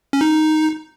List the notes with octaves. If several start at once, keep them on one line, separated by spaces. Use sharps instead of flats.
C#4
D#4